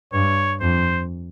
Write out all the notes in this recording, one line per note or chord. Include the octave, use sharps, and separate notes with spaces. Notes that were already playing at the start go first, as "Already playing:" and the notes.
G2 C#5
F2 C5